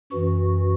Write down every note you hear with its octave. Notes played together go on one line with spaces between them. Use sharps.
F#2 E3 F#4